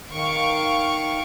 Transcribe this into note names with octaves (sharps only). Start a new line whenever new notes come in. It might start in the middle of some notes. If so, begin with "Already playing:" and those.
D#3 F5 C#6 D7